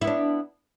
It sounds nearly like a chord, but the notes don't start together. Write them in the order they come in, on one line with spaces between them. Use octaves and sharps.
E4 B3 D4